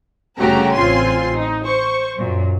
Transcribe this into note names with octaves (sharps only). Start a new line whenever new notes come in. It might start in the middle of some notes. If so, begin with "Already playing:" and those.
G1 C#3 A3 F#4 G4 A#5
A1 C4 F4 G#5 C6
D#4
C5 C#6
F#2 A#2 F#3